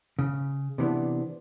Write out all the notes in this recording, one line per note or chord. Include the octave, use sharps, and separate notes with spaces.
C#3
C3 E3 B3 D4